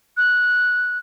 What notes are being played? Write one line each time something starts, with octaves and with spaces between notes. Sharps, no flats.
F#6